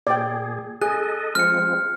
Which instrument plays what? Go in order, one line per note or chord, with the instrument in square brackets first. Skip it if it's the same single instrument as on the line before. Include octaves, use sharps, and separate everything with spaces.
[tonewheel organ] A#2 G#4 [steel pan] D5 G5
[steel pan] G#4 [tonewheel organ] A4 D#5 [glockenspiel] F#6
[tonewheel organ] F3 G#3 C4 [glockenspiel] F6 C#7